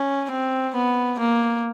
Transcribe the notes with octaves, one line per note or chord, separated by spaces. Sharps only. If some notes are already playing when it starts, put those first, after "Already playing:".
Already playing: C#4
C4
B3
A#3